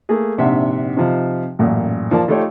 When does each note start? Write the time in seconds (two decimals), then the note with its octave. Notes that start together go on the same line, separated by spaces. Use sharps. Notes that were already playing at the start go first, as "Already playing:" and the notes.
0.09 A3 A#3 G#4
0.38 A#1 G#2 C3 D4 E5 F#5
0.97 C3 F3 D#4
1.59 A1 F#2 A#2
2.11 F3 A#3 D5 A5
2.28 F3 A3 D#4 F4 G4 C#5